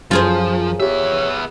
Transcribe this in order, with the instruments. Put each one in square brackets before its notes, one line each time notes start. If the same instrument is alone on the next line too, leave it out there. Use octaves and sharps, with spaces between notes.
[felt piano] F#2 [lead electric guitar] F3 [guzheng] F4 G#4 C5
[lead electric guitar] B3 E5 [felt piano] G4 [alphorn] C#5